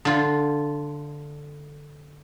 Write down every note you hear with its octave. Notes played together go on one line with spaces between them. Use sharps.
D3 F4